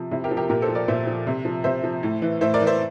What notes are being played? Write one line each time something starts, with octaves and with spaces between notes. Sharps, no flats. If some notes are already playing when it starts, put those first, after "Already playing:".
Already playing: C3 F3
C3 E4
G4 A#4
F3
G4 A#4
A#2 G4 A#4
A4 C5
F3
A#4 D5
A#2 C5 E5
F3
C3
F3
C3 C5 E5
F3
A2
E3
A2 C5 E5
A#4 D5
E3
C5 E5